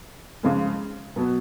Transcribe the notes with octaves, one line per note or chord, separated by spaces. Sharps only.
C#3 F3 G#3
B2 F#3 B3